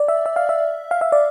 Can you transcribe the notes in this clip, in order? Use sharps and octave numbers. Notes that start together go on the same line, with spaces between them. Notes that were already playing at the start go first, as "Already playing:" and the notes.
Already playing: D5
E5
E5
F5
E5
F5
E5
D5